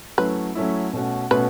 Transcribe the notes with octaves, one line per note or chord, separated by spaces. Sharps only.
F#3 A3 C#4 E4 B4
F#3 A3 C#4 E4
B2 A3 C#4 F#4
B2 A3 C#4 F#4 B4